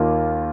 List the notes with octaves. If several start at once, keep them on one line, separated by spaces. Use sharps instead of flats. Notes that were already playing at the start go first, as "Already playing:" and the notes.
Already playing: D#2 D#3 A#3 F4 A#4